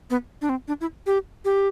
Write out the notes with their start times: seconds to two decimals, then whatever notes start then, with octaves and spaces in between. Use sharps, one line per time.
0.10 B3
0.42 D4
0.49 C4
0.68 D4
0.81 E4
1.06 G4
1.45 G4